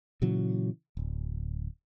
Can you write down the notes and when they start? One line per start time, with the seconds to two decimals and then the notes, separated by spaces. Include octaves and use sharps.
0.22 A#2 C#3 E3 F#3
0.97 D1